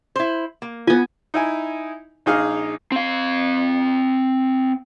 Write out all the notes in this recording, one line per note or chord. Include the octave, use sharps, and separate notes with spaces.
E4 C5
A#3
B3 F4 G#5
D#4 E4 G#5
A#1 D#4 G#4 F5 F6
C4 F5